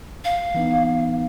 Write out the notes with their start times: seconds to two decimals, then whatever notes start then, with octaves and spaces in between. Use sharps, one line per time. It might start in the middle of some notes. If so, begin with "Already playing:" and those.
0.25 F5
0.55 E3 B3 D#4